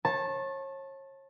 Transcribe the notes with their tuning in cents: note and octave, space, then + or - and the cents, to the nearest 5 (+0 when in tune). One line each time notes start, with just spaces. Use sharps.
C#5 -35 A5 +0